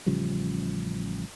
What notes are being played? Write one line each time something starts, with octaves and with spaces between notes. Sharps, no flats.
A1 C#3 F3 G3